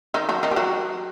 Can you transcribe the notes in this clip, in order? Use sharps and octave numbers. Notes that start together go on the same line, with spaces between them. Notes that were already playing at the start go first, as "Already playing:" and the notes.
D#3 D#4
F#3 F#4
D#3 D#4
G4
F#3 F#4